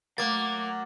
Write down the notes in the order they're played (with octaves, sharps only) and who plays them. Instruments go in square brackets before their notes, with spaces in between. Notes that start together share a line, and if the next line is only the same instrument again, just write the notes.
[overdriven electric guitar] F#3 F#5 [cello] A3 [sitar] A#3 [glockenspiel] D6 A6